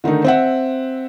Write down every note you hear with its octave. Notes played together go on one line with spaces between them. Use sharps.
D3 D#3 A3 D#4
C4 E5 F#5